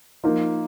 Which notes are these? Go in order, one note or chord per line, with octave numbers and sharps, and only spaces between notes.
F3 A#3 D#4 F4